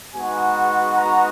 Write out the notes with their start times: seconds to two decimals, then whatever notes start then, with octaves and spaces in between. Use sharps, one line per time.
0.13 G#3 B3 D#4 F#4 G#5
0.97 A#5